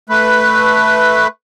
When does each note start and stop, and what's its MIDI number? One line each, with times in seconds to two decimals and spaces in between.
0.09 1.27 57
0.09 1.27 71